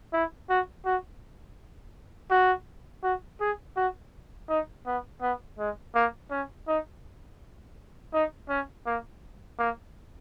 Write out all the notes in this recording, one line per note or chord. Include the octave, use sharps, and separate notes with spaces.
E4
F#4
F#4
F#4
F#4
G#4
F#4
D#4
B3
B3
G#3
A#3
C#4
D#4
D#4
C#4
A#3
A#3